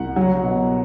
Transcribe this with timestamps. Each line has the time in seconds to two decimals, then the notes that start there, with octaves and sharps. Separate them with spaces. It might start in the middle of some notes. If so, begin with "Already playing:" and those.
Already playing: C2 F#5
0.16 F#3
0.44 B2